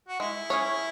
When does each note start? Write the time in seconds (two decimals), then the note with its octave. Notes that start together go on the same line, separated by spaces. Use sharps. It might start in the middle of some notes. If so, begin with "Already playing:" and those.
0.08 F#4
0.20 G#3 E4
0.50 C#4 G#4 C#5